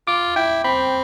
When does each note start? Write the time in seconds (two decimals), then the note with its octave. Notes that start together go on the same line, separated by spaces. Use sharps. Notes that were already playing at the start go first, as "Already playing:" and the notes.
0.07 F4 D6
0.36 E4 G5
0.64 C4 B5